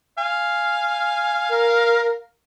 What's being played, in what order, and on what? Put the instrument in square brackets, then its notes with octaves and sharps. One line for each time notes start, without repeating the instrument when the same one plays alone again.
[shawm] F5 [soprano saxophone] G#5
[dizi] A#4